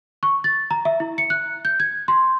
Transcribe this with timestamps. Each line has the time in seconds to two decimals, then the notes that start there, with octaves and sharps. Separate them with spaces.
0.23 C#6
0.44 A6
0.71 A#5
0.85 E5
1.00 E4
1.18 C#7
1.30 F#6
1.65 G6
1.80 G#6
2.08 C6